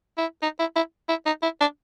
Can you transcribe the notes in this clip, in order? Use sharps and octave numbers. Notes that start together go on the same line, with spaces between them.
E4
D#4
E4
E4
E4
D#4
E4
D4